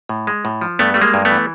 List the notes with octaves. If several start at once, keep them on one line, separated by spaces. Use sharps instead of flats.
A2
G#3
A2
F3
G2 A3 B3
G3 A3
G#3 A#3
G2
A3 B3
E3